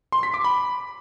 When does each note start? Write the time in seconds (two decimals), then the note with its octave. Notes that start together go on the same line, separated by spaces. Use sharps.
0.12 C6
0.23 B6
0.34 D6
0.44 B5